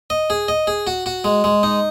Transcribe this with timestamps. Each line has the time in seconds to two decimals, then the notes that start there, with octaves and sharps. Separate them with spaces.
0.10 D#5
0.30 G#4
0.48 D#5
0.67 G#4
0.87 F#4
1.06 F#4
1.24 G#3
1.44 G#3
1.63 D#4